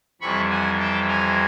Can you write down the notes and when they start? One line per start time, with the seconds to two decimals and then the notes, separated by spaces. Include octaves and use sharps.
0.21 F2 C3 E3 G3 B5 C#6
0.50 F#5 G#5
0.79 G5 A5
1.08 G#5 A#5